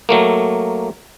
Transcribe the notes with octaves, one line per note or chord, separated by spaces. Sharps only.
F#3 A3 A#3